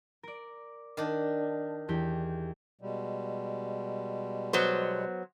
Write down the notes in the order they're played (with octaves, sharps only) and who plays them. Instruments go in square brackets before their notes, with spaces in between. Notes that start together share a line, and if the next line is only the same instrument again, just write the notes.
[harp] A#4 D5
[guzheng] D#3 D4
[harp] E2 G4
[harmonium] B2 G3 G#3
[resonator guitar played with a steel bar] F#3 B3 C5